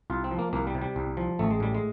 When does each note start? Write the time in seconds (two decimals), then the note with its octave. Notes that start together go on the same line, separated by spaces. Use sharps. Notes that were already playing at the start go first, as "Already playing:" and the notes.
0.10 C2 F4
0.24 C4
0.31 F3
0.39 A#3
0.53 C2 A#3
0.67 G3
0.74 C3
0.81 G3
0.96 C2
1.17 F3
1.39 A1 A3
1.51 G#3
1.60 A2 G3
1.75 G#3